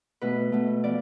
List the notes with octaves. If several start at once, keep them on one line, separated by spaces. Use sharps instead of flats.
B2 A3 B4
B2 A3
F3 B3 D5